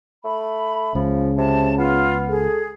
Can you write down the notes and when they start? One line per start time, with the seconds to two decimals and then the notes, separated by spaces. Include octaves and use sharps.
0.25 A3 B5
0.95 C#2 C#3 F3
1.37 C3 A5
1.78 B3 F4
2.28 G#4 A4